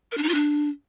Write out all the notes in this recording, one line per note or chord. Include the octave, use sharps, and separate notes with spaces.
A#4
D4
D#4
F4
D4